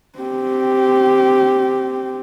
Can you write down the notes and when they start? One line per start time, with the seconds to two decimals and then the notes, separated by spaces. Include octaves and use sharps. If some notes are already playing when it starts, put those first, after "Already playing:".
0.19 C4 G4